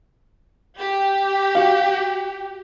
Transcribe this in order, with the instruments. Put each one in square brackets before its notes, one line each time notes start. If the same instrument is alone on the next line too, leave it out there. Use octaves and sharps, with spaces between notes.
[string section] G4
[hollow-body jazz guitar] F#4 F5